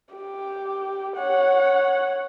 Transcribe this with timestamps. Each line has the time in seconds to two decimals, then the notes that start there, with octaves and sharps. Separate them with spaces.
0.15 G4
1.16 C#5 F#5